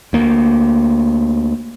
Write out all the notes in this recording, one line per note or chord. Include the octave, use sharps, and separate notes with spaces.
D2 A#3